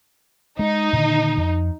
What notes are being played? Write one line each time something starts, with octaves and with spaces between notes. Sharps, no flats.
G#3 D#4
A#2 D3 D#3
F2